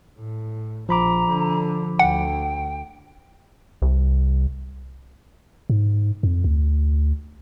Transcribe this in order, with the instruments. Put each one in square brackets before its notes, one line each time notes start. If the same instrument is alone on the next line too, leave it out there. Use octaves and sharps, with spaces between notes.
[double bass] A2
[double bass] A#1 [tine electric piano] F3 B5 D6 [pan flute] A#5
[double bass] D3
[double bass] D2 [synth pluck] F#5 [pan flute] G5
[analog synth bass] C2
[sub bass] G#2
F2
D2